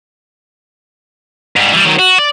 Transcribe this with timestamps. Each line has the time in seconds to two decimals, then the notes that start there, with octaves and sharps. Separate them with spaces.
1.56 G#2 G3
1.72 E3 G3
1.85 D#3 F#3
1.99 F#4
2.18 D5